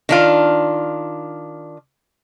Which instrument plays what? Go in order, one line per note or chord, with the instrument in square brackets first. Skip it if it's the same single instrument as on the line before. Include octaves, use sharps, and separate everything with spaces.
[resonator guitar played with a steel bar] D#3 D4 F4